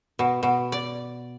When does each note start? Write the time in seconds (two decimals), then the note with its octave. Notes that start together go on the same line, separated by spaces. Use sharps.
0.19 B2
0.43 B2
0.72 D5